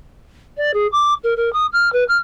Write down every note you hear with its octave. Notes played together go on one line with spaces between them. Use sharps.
D5
G#4
D6
A#4
A#4
D#6
F6
B4
F6